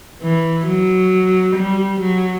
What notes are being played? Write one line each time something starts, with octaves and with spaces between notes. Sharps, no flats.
E3
F#3
G3
F#3